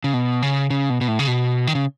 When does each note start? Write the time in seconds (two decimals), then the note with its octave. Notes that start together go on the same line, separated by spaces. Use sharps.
0.04 C#3
0.14 B2
0.42 C#3
0.70 C#3
0.90 B2
1.01 B2
1.08 A2
1.19 C#3
1.27 B2
1.67 D#3
1.75 C#3